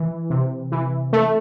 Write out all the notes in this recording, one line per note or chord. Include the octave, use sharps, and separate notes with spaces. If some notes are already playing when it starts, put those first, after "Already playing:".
Already playing: E3
C3
E3
A3